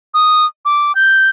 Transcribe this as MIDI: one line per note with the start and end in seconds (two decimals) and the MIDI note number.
0.14 0.45 87
0.65 0.95 86
0.95 1.30 91